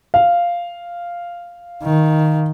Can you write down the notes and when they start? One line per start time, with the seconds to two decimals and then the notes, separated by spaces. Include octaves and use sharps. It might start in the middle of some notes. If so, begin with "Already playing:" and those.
0.14 F5
1.83 D#3